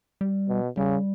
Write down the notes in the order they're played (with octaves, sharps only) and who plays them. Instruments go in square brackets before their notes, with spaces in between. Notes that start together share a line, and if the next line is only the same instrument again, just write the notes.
[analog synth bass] G3
[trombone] B2
[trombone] C#3 [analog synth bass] G3